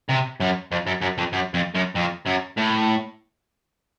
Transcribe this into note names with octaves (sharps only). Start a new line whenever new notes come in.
C3
F#2
F2
F#2
F#2
F2
F#2
F2
F#2
F2
F#2
A2